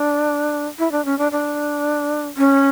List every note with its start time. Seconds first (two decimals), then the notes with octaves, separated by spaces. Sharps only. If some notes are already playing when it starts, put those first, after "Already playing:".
Already playing: D4
0.79 E4
0.92 D4
1.05 C#4
1.18 D4
1.32 D4
2.37 C#4